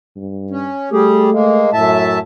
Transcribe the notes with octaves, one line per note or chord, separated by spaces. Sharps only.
G2
C#4
G3 A3 G4 G#4
G#3 A#3
F#2 A2 E5 A5